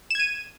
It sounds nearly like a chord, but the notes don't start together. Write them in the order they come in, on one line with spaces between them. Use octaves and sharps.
E7 G#6 D#7